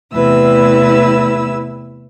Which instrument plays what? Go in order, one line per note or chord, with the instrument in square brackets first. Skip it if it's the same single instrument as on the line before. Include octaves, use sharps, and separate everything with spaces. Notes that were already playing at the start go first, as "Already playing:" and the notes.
[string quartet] E2 C3 A3 E4 B4 E6